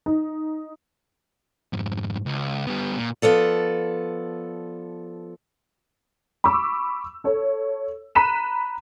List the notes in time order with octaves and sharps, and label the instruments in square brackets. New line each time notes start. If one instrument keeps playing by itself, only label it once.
[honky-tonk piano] D#4
[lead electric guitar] F2 G#2
C#2
G3 B3
A#2
[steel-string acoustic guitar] F3 B3 A4 D5
[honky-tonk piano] B5 C#6 D6 E6
A4 C#5
A#5 B5 F#6 B6 D#7 E7